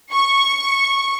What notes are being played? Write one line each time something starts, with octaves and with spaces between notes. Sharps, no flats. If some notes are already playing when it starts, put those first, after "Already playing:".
C#6